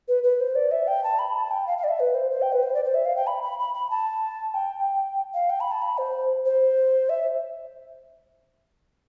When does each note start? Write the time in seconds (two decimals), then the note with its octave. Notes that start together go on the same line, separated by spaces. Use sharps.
0.08 B4
0.24 B4
0.40 C5
0.55 D5
0.71 E5
0.87 G5
1.04 A5
1.19 B5
1.36 A5
1.51 G5
1.67 F5
1.78 F5
1.84 D5
1.89 E5
2.00 B4
2.15 C5
2.31 C5
2.42 G5
2.52 B4
2.63 C5
2.74 D5
2.84 C5
2.94 E5
3.05 F5
3.16 G5
3.27 B5
3.43 B5
3.59 B5
3.74 B5
3.90 A5
4.54 G5
5.34 F5
5.50 G5
5.60 B5
5.71 A5
5.82 B5
5.98 C5
6.46 C5
7.09 E5